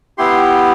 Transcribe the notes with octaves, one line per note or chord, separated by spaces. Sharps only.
B3 E4 G4 C6